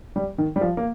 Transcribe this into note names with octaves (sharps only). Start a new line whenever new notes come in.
G3
D#3
G3
F3
A#3